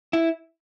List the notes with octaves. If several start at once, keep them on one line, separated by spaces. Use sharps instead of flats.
E4